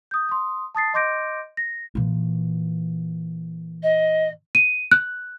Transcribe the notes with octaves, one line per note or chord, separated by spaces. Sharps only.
D#6 G6
C6 D#6
A5 D#6 A6 C7
D#5 C6 D6 G6 A#6 D7
A#6
A#2 E3
D#5
D#7
F#6